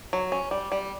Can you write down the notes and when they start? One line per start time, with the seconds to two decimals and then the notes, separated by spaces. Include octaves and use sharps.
0.13 F#3
0.32 C#4
0.51 G3
0.72 G3